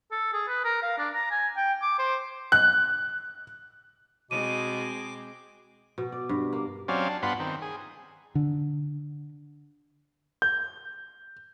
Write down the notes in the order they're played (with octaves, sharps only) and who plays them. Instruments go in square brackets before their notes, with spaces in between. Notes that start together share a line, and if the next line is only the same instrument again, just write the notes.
[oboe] A4
G#4
B4
A#4
F5
D4
A#5
G#5
G5
D6
C5
[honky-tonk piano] F#6
[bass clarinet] B2 [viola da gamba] G#3 C4 [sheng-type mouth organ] D6 [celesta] D#7
[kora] B2
D5
G2
A#3
[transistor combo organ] F#3 C4 C#4 D5 F5
D4
G2 B3 F4 F#5 B5 C6
D#3 C4
G#4
[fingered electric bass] D3
[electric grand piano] G6